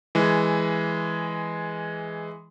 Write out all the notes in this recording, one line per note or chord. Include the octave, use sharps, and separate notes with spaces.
E3 G#3